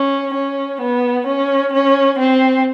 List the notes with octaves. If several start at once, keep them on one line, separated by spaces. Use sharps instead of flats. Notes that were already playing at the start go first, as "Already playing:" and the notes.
Already playing: C#4
C#4
B3
C#4
C#4
C4